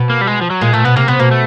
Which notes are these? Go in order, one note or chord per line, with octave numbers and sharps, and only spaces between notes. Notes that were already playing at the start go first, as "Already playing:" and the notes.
Already playing: B2
A#3
G3
G#3
F3
F#3
A#2 G#3
A#2 A3
B2 B3
C3 A#3
C3 B3
B2 A#3
A3